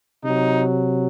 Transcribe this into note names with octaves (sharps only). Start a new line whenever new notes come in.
C3 F#3 D#4